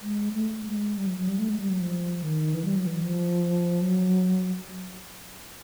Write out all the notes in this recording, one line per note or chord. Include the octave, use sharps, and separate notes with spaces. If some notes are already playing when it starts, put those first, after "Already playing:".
G#3
A3
G#3
G3
F#3
F#3
G3
A3
G#3
G3
F#3
F3
D#3
E3
G3
F#3
E3
F3
F#3